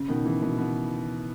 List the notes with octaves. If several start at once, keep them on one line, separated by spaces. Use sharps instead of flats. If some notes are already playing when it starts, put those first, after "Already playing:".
Already playing: C#3
B2 D#3
C#3 E3
B2 D#3
B2